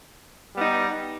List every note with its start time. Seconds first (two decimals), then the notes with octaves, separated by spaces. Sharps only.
0.55 G3 B3 D#4